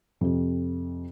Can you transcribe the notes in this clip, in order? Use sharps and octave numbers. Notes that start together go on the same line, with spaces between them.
F2 C3